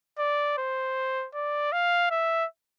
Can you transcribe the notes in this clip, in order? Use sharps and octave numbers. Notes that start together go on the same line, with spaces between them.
D5
C5
D5
F5
E5